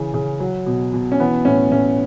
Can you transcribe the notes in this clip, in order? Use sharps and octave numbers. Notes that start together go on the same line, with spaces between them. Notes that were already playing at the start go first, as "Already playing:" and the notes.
Already playing: C#3 E3
C#3
F#3
B2
B2
C#4
E3 B3
A2 C#4
A2 C#4